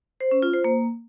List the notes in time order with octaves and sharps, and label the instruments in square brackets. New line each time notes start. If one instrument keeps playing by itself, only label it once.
[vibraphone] C5
C#4
F4
C5
A#3